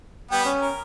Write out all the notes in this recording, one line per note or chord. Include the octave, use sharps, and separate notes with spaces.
G3 B3 B4 G5
C#4
A#4